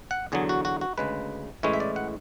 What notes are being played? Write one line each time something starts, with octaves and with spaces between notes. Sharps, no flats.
F#5
E2 D3 F#3 G#4
F#4
F#4
F#4
D2 C#3 G#3 B4
A2 E3 G#3 C#4 E4 C#5
E5
D5
F#5